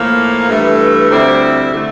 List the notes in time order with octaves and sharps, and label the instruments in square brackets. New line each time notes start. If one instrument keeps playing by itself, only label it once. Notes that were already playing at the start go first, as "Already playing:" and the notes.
Already playing: [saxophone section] A2 F3 A#3
G2 E3 A3
D2 C3 G3 C4 E4
D3 A3